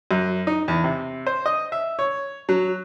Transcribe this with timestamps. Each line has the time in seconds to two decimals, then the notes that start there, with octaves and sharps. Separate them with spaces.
0.11 F#2
0.47 D#4
0.68 E2
0.84 C3
1.26 C5
1.46 D#5
1.72 E5
1.99 C#5
2.49 F#3